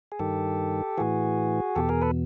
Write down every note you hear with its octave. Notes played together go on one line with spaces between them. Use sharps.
G#4
G2 D#3 G4 A4
A2 E3 F#4 G#4
E2 B2 G4 A4
G#4 A#4
A4 B4